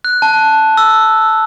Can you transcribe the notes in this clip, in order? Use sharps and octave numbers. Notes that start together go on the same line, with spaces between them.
F#6
A5
E6